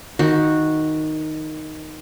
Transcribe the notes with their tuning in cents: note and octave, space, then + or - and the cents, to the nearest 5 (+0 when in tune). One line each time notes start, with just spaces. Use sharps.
D#3 +0 F#4 -10